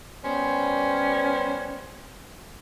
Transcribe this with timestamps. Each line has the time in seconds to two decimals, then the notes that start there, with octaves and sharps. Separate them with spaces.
0.24 G3 B3 C#4 C5